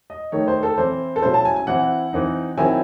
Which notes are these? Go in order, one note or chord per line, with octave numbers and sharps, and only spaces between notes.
D#5
D#3 A3 D#4 C#5
C5
A4
E3 C4 E4 C5
A4
C#3 F#3 C#4 E4 C5
A5
G#5
G#5
E3 C4 E4 F#5
E3 C4 D#4
D#3 F#3 C4 E4 G#5